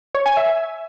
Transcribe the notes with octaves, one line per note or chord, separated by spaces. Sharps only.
C#5
G#5
E5